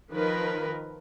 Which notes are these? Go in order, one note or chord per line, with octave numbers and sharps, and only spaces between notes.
D#3 F3 A#4 B4